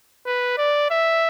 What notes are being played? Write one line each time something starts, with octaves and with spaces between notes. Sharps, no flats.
B4
D5
E5